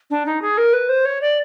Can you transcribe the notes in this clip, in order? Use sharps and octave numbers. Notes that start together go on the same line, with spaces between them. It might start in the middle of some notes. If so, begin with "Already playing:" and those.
D4
D#4
G#4
A#4
B4
C5
C#5
D5